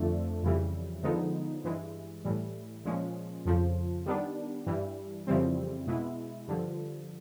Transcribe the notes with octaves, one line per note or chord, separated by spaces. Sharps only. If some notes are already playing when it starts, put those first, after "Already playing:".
Already playing: F2 D3 F3 A3 D4
F2 C#3 E3 G3
D3 F3 G#3 B3 D#4
G2 E3 G#3
A2 E3 G3
A#2 F3 G#3 C#4
F2 C#3 F3
D#3 G3 B3 D4
G2 E3 G3
F2 C#3 E3 G3 C4
B2 G#3 B3 E4
G2 D3 F3